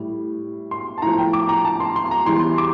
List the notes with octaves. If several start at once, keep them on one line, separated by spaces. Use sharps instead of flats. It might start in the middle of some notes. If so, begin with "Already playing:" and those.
Already playing: A2 G3
C6
A5
A2 F3 A#5
G5
D6
A#5
A5
C6
C6
A#5
E2 E3 G3 C6
D6